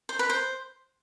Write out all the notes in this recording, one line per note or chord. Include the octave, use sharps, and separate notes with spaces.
C5
B4
C5